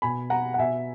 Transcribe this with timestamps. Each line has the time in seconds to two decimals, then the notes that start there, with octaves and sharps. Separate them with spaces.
0.02 B2 G#5 B5
0.30 F#5 A#5
0.54 F#5
0.58 B2 E5 G#5